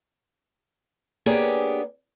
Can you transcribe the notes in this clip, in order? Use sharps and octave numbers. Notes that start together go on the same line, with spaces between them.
A#3 B3 D4 G4 G#4 C#5